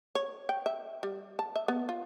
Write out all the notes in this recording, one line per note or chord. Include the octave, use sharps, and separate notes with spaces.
C#5
G5
E5
G3
A5
E5
B3
F4